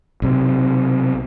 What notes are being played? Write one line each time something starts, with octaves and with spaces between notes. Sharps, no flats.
B1 C3